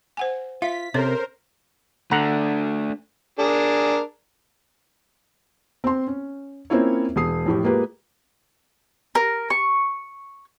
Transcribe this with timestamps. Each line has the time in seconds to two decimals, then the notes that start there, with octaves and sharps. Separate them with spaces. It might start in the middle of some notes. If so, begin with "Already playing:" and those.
0.17 C5 F#5 G#5
0.62 F4 E5 F5 B6
0.94 C3 C#4 A4 A#4 C5 C#5
2.11 D3 A3 D4 F#5 A#5
3.39 D4 G#4 A#4
5.84 C4 C6
6.07 C#4
6.70 A#3 C4 C#4 E4 F4 C#5
7.16 E1 G#4 D#6 C7
7.46 F2 A2 G4
7.64 G#3 A#3 F4 G4 B4
9.15 A#4
9.50 C#6